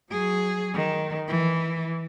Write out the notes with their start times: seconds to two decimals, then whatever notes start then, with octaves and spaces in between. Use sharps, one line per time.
0.10 F#3 G#4
0.74 D#3
1.28 E3